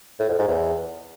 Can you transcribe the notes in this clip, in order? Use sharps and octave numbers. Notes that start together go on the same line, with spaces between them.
A2
F2
G#2
E2